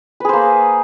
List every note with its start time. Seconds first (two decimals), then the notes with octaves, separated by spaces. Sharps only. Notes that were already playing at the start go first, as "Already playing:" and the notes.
0.20 B4
0.25 G#4
0.29 C5
0.33 A#3